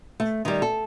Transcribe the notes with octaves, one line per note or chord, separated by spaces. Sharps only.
A3
D#3 G3
A4